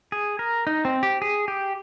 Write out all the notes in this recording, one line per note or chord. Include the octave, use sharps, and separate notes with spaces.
G#4
A#4
D#4
C4
G4
G#4
G4